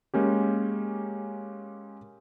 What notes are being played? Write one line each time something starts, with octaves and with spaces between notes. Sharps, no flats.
G#3 A#3 C#4 G4